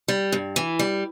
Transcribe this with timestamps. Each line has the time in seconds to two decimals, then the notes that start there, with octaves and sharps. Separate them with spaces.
0.08 G3
0.32 G2
0.56 E3
0.79 G3